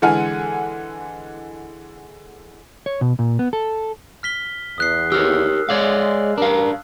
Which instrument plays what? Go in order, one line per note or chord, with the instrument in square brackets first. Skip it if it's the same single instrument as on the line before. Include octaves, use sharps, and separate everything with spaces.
[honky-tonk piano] D3 E3 G#3 F#5 G#5 F6
[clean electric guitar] C#5
B2
A#2
B3
A4
[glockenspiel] F6 B6 G7
[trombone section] E2 [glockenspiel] D#6 F#6 C7
[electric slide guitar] G4 A#4 C#5 [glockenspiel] E6 F6
[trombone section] G#3 [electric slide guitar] C#5 D5 F5
[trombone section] A1 G2 A#4 [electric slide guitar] D4 F5